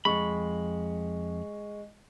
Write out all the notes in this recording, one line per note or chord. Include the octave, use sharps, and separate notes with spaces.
F2 G#3 B5 C#6